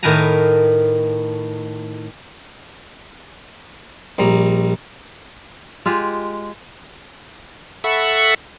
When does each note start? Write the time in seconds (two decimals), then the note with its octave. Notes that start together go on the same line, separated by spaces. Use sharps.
0.03 A2 D#3 A#4 B4 G#5 A#5
4.18 A#1 G3 A#5
5.86 G#3 F4 G4
7.84 A4 E5 F#5 B5 C#6